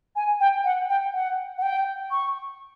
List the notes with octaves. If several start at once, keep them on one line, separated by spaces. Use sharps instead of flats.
G#5
G5
F#5
G5
F#5
F#5
G5
C#6